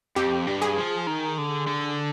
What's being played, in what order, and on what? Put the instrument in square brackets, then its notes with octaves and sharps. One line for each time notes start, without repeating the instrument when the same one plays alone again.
[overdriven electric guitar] F2 [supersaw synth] G4
[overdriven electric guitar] G2
[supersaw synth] G#4
[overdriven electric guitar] F3
D#3
D3
D3